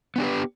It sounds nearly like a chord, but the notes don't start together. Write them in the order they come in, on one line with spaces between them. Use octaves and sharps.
B3 D4 G4 B4